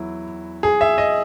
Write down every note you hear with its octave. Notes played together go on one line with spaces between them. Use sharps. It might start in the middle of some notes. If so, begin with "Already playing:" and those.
Already playing: E2 F#3 E4
G#4
E5
D#5